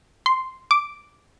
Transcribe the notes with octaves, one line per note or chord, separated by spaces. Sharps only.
C6
D6